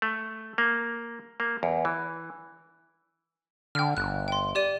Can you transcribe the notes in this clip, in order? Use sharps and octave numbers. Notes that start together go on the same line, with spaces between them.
A3
A#3
A#3
E2
E3
D3 G5 F6
G1 F#6
G5 C6
G4 D5 D#7